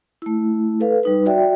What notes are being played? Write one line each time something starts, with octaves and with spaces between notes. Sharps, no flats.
A3 E4
A4 B4 F5
G3 D#4 B4
F#4 D5 E5 G5